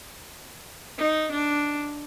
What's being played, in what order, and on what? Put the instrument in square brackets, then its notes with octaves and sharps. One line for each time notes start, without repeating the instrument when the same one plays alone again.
[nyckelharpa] D#4
D4